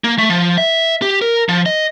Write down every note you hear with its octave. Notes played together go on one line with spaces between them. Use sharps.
A#3
A3
F3
E5
G4
A#4
F3
D#5